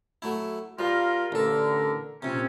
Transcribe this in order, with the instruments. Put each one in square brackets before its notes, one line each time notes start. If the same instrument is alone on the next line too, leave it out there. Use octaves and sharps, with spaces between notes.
[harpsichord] F#3 A3 E4
[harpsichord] G3 [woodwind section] F4 A#4
[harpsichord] A1 A4 [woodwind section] D3 A#4
[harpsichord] A#1 C3 [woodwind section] C4 C#4